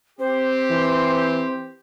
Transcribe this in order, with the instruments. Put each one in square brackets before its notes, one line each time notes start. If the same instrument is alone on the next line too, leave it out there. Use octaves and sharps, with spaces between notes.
[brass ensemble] C4 G4 [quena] C5
[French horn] E3